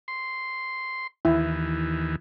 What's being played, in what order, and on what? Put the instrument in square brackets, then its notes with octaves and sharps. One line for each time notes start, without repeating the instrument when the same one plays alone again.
[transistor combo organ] C6
[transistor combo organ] D#2 E3 [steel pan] E4